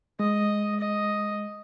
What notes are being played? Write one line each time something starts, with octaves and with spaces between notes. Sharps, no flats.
G#3 D#5
D#5